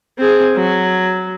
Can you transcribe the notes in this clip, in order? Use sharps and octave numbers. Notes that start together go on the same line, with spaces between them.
C4 G#4
F#3